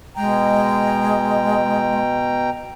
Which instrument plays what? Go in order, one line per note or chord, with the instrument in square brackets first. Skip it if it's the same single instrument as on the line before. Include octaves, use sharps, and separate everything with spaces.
[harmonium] B2 G5 A#5 [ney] G#3